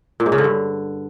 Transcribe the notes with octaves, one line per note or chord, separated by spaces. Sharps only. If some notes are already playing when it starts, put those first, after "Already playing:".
A#2
G#2
C#3
D3
G2